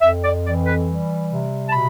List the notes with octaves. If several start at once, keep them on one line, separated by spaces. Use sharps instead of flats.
F2 E5
D5
E3 D5
B4
G3
C3
A5
B2 B5